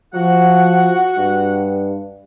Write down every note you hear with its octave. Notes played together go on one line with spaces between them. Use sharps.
F3 F#4 F#5
G2